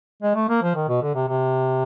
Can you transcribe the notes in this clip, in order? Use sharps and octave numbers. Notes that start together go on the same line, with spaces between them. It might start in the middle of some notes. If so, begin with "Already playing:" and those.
G#3
A3
A#3
F3
D#3
B2
D3
C3
C3